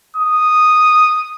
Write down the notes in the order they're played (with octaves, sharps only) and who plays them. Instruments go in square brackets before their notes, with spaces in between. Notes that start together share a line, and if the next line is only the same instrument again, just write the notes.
[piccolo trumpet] D#6